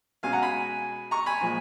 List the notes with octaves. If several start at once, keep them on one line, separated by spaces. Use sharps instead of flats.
B2 G#3 C#4 F5 G#5
F#5 A#5
G#5 B5
A#5 C#6
G#5 B5
A#2 F3 G#3